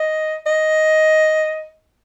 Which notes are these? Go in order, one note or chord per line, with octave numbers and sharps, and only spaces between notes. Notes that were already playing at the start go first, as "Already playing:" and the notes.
Already playing: D#5
D#5